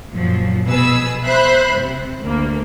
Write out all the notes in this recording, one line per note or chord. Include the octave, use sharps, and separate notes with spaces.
F#2 A#2 F3 F#3
B2 G#4 B4 E6
C5 E5 B5 F#6
C3
D2 A#3